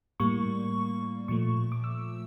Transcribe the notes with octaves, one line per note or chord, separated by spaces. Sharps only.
A2 G3 A#3 C#6
A#2 F3 A3 C#6
D6
E6